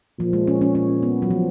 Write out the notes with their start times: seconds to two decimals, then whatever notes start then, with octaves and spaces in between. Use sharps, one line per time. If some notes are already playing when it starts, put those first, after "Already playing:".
0.19 A#2 F3
0.33 G#3
0.47 C#4
0.61 C#4
0.75 C#4
1.03 B3
1.22 F#3
1.30 F3